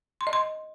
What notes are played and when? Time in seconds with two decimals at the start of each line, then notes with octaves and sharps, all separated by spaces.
0.21 C6
0.27 D#5
0.33 C6